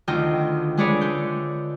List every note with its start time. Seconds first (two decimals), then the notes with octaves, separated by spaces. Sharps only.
0.08 D2 D#3 F4 D#5 G5
0.77 G#3 D4 G#4 B4 C#5 D5
1.01 D3 G6